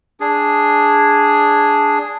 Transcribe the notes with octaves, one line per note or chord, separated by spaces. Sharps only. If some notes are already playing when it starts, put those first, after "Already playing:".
D4 G#4